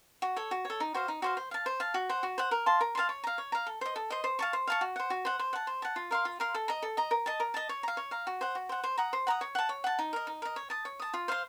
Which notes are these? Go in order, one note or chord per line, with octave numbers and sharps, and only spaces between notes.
F#4
A4 C#5
F#4
A4 C#5
D#4
F#4 C5 F5
D#4
F#4 C5 F5
C5
F5 A5
C5
F5 A5
F#4
C5 F#5
F#4
C5 F#5
A#4
F5 A5 C6
A#4
F5 A5 C6
C#5
F5 A#5
C#5
F5 A#5
A4
C5 D#5
A4
C5 D#5
C5
F5 A5 C#6
C5
F5 A5 C#6
F#4
C5 F#5
F#4
C5 F#5
C5
F#5 A5
C5
F#5 A5
F4
A#4 F5 C6
F4
A#4 F5 C6
A4
D#5 A#5
A4
D#5 A#5
A#4
D#5 A5
A#4
D#5 A5
C#5
F5 A#5
C#5
F5 A#5
F#4
C5 F#5
F#4
C5 F#5
C5
F#5 A#5 D#6
C5
F#5 A#5 D#6
C#5
F#5 A5
C#5
F#5 A5
D#4
A#4 D#5
D#4
A#4 D#5
C#5
A5 D#6
C#5
A5 D#6
F4
C5 F5 C6